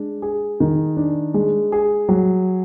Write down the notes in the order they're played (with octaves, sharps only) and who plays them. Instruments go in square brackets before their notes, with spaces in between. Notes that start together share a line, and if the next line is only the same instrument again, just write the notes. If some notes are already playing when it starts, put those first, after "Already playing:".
Already playing: [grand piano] G#3 D4
G#4
D#3
D4
G#3
G#4
F#3